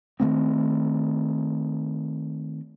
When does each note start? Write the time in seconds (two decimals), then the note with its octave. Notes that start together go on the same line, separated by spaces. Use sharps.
0.20 D#3 F#3 A3 C4